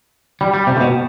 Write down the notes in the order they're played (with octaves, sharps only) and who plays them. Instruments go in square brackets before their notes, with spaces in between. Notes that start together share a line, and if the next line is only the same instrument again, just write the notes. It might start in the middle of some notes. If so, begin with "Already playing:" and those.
[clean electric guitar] G3
G3
C3
A2
B2